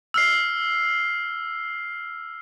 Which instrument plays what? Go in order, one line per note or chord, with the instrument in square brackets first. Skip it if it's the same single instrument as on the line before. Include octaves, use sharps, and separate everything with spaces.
[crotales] E6 F6 C7